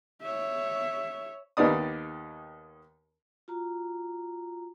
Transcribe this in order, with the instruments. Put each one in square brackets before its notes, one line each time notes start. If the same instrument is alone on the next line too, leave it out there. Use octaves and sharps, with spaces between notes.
[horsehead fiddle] C#5 E5
[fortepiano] D#2 D#3 B3 D#4 D5 D#6
[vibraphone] F4 F#4 A#5